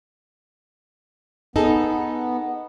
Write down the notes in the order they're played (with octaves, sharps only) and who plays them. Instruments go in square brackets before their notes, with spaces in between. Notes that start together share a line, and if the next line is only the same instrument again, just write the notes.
[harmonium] B3 [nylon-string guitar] D#4 G#4 A4